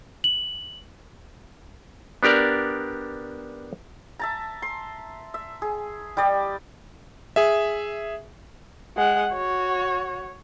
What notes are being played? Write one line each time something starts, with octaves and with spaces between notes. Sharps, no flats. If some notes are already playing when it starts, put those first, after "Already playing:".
F#7
B3 D4 G4 A#4 D5
E5 A5 A#5
C6
E5
G#4
G3 G4 D5 D#5
G#4 E5
G#3 F#5
F#4 C#5